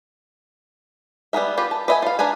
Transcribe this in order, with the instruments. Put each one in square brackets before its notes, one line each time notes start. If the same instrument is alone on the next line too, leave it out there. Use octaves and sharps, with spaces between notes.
[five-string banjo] G3 B3 G#4 A#4 E5
F4 G4 B4
A5
B4 D#5 E5 G5 G#5
F4 F5
D4 A#4 B4 G#5